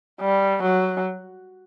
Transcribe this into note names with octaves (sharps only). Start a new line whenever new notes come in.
G3
F#3